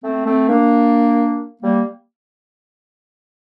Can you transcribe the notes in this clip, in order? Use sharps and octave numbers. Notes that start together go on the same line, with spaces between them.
A3 C4
A3 C4
A#3 D4
G3 A#3